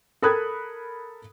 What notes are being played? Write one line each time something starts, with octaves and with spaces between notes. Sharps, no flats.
A4 A#4 B5 D#6 F#6 G#6